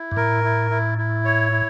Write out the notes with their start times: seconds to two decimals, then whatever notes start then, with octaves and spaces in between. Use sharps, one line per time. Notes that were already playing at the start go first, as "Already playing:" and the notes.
Already playing: E4
0.11 G2
0.17 A2 A#4
0.44 E4
0.71 E4
0.98 E4
1.25 C#5
1.52 E4